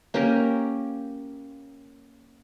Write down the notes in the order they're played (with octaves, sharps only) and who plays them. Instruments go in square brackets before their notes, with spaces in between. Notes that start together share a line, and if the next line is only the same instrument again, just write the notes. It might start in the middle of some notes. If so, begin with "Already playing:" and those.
[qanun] A#3 C#4 G4 A#4